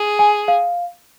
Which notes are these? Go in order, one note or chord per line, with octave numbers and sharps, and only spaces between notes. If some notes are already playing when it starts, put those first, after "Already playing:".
Already playing: G#4
G#5
F5